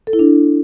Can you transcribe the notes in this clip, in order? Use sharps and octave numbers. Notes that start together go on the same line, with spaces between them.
A4
E4
D4